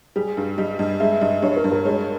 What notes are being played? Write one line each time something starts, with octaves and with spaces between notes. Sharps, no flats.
G3 G#4
G2
G3 D#5
G2 D#5
G#3 E5
G2 D#5
G2 C#5
A#4
G2
A#4
G#3 C#5